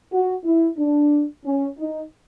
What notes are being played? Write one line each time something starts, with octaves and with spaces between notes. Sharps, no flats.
F#4
E4
D4
C#4
D#4